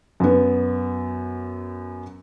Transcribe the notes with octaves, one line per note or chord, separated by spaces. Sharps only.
F#2 B3